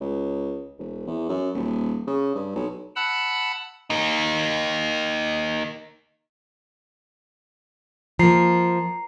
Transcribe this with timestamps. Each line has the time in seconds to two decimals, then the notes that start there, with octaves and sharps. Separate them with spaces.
0.01 C#2
0.79 E1
1.07 E2
1.29 F#2
1.54 D#1
2.07 C#3
2.35 G2
2.56 B1
2.96 F#5 A5 B5 E6 F#6
3.90 A#3 D#4
8.19 F3 A#3 A#5 C7